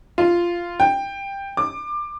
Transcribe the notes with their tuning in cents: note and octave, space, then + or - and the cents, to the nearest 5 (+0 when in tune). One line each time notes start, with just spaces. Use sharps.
F4 -10
G5 +10
D6 +20